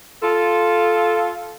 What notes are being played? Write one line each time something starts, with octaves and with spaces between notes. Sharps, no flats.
F4 A4